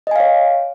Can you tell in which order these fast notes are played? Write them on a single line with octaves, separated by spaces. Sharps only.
D#5 G#5 F5 C#5